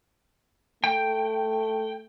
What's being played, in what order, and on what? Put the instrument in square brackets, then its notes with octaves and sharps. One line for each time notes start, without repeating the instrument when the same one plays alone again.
[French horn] A3 [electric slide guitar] G5